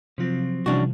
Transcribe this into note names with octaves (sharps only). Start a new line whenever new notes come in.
C3 F3 F#3 C4 F4
C3 E3 F3 G3 C#4 D4 F#4